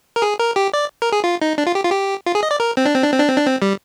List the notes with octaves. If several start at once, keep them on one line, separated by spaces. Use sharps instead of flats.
A#4
G#4
A#4
G4
D5
A#4
G#4
F4
D#4
D4
F4
G4
F4
G4
F4
G#4
D#5
D5
A#4
C4
D4
C4
D4
C4
D4
C4
D4
C4
G3